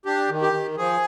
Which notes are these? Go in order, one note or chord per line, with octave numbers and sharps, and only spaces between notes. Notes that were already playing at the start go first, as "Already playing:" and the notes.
D4 G4
D#3
G4
D#3
F3 G#4